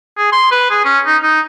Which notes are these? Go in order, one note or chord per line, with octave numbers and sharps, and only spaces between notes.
G#4
C6
B4
G#4
C#4
D#4
D#4